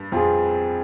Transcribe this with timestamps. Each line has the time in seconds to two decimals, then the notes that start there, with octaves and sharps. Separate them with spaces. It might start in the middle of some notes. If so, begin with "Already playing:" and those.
Already playing: G2 A#3
0.12 F2 C4 F4 G#4